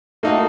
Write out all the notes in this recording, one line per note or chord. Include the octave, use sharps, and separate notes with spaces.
A3 A#3 D#4 F#4